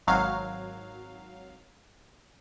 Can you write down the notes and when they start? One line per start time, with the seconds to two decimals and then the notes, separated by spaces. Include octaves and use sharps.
0.07 G#1 F#3 F5